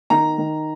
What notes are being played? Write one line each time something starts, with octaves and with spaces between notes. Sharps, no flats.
D#3 A#5
D#3